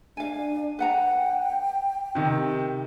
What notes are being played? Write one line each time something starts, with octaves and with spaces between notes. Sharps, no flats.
D4 F5 G#5
B4 F#5 G5 A#5
C3 D#3